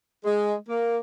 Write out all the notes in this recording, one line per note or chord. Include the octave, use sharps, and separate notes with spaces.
G#3
A#3